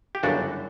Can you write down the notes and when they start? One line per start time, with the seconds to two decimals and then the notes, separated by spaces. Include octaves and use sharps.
0.15 G4
0.23 G1 F#2 C#3 E3 D4 F#4